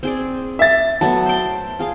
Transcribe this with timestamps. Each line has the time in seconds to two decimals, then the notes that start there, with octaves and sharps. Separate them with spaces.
0.03 C4 G#4 D5
0.59 E5 A6
1.01 F#3 A3 B3 A5
1.26 C5 G5
1.79 F4 G#4 F5